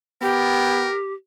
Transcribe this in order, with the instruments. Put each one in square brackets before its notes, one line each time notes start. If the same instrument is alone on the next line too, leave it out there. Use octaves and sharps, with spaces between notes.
[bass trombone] B3 [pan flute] G4 [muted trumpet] A#4 [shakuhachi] G5